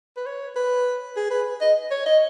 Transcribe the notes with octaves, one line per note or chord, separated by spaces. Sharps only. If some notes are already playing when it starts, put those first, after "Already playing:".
B4
C#5
B4
G#4
B4
D#5
C#5
D#5